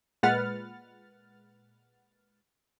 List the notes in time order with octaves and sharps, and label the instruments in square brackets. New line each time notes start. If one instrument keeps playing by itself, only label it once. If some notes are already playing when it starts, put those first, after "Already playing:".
[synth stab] A#2 G#3 B4 F#5 F6 A6